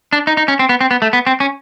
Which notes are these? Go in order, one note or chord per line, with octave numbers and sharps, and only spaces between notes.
D4
D#4
D#4
C#4
C4
B3
C4
B3
A3
B3
C4
C#4